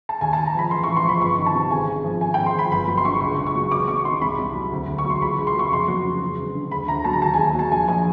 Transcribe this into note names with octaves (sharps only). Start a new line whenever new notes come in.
A5
D#2 G#5
D#2 A5
A#5
F3 B5
A1 C6
A1 C#6
C6
F3 B5
G1 C#6
D#3
A5
C3
G#1 G#5
G#1
F3
G#1 G#5
G#1 G5
C6
F3 B5
G1 B5
F#3 B5
C6
D3 C#6
C#2 C#6
C#2
C#6
F#3
E1 D6
F#3 C#6
D#3 C6
C2 B5
C2
F#3
D2
D2
C#6
F#3
C6
C#2 B5
C#2
C6
F#3 C#6
F1 C6
F#3
C#3
E1
E1
D3
D2 B5
D2 A#5
F#3 A5
A#5
D#2 A5
G#5
D#2
G#5
F#3 A5
A#1 G#5
A#1 G#5